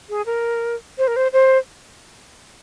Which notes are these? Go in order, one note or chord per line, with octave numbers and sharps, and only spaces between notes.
G#4
A#4
C5
A#4
C5
C5